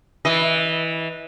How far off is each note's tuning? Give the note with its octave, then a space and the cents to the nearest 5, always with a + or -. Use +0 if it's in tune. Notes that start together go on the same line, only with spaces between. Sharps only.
E3 -15 D#5 +0